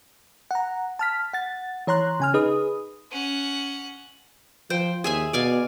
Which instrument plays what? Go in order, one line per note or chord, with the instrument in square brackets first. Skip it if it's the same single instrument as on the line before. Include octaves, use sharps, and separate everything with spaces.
[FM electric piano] F#5 A#5
A5 F6 B6
F#5 A6
E3 C#5 A#5 C6 F#6
C#3 G#5 F6
D#4 G#4 B4 D#6
[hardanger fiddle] C#4 F#5
[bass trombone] F3 [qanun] C5 G5
[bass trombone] D#2 [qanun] G#4 E5 G#5
[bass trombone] B2 [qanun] D5 F5 G#5